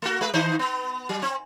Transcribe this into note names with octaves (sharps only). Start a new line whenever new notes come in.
A3 F#4
G#3 B4
D#3 D#4 C5
B3
F#3
C4